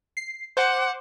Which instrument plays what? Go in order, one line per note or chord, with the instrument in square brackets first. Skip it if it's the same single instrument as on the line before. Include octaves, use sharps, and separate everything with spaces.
[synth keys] C7
[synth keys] C5 C6 D6 [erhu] F#5